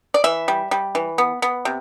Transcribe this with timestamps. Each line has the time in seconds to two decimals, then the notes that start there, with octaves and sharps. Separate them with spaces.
0.14 D5
0.24 E3 E5
0.48 G3
0.71 G3
0.95 E3
1.18 B3
1.42 B3
1.65 C3